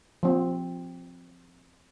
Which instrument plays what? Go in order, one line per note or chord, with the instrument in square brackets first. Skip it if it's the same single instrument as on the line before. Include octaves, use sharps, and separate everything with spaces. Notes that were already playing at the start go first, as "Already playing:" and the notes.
[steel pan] F3 C4